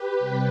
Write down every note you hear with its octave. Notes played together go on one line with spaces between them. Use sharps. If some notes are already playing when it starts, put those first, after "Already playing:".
Already playing: G4 B4
C3 G3 C4